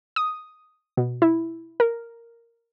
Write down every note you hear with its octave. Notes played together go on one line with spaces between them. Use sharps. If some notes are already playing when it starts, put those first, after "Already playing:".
D#6
B2
E4
A#4